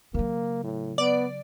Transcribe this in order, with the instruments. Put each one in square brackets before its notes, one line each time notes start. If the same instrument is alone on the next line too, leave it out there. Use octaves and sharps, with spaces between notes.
[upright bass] C#3 F#3 [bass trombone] A#3
[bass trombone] A2
[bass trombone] B3 [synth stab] D5